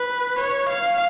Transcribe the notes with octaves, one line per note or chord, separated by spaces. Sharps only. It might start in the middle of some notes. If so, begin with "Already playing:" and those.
Already playing: B4
C#5
F5